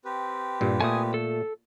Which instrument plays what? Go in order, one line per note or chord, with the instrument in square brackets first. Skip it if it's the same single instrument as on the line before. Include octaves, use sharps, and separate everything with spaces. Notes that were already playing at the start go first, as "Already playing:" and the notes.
[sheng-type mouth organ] C4 G4 B4
[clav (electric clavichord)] G2 A#2
[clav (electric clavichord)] A#2 A3 [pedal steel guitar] G#5 D#6
[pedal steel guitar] A4